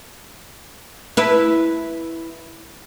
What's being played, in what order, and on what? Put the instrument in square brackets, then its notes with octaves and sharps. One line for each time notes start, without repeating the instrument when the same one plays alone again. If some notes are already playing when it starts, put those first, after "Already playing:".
[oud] E4 B4